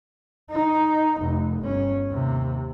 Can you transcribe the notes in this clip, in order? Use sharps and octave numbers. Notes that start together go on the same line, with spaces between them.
D#4
F1
G1 C#4
D#2 C3